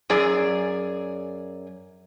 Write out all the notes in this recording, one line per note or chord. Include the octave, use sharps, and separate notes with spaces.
F#2 G#4 D5